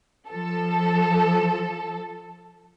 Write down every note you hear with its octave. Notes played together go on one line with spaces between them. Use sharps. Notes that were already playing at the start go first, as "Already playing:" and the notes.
F3 A4